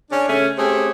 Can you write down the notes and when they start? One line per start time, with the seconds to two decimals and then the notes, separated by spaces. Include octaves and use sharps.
0.11 C#4 D4
0.28 C#3 A3 C#4
0.58 A3 C4 C#4 G4 G#4